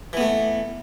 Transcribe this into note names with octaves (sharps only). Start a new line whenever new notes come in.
E3 A3 B3